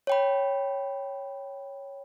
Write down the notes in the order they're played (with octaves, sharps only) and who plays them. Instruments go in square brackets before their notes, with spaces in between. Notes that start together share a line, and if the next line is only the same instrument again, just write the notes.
[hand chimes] C#5 G5 B5